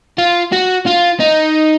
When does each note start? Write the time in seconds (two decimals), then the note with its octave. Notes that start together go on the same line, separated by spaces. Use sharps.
0.18 F4
0.52 F#4
0.86 F4
1.20 D#4